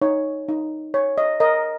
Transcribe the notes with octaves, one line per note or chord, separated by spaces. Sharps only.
D#4 C#5
D#4
C#5
D#5
A#4 D#5